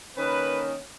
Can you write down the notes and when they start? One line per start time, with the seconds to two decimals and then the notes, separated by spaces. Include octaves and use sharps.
0.17 D#3 A#3 C#4 B4